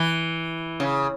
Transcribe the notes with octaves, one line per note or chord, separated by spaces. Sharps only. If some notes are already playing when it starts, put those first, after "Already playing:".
Already playing: E3
C#3